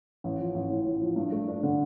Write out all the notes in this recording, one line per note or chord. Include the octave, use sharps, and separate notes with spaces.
A1
F3
A1
A2
A1
F3
G2
A3
D4
D3